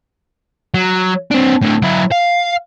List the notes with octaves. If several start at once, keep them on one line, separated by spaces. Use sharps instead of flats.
F#3
C4 D4
A2 D3
F#3 E4
F5